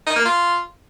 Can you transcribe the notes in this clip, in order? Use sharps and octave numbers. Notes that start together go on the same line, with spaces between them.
D#4
A#3
F4